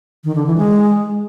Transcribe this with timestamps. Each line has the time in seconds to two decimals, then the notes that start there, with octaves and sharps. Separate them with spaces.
0.24 D#3
0.35 D3
0.46 E3
0.58 G#3